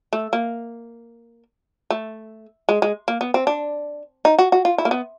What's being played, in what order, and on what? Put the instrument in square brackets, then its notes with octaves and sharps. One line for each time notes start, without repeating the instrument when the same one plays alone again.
[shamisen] A3
A#3
A3
G#3
G#3
A#3
B3
C4
D4
D#4
F#4
F#4
F4
E4
A#3
B3